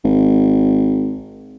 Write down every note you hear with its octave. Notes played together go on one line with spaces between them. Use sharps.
G#1